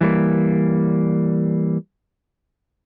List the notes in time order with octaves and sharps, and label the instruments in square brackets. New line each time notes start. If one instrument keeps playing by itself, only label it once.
[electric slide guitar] E3 G3 A#3